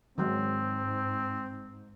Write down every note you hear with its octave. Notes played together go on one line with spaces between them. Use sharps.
G#2 D#3 F#3 G#3 C4